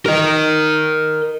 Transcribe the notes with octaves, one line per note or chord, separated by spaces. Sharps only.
A#4 D#5